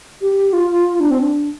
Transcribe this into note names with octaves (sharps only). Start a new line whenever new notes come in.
G4
F4
D4
C4
D4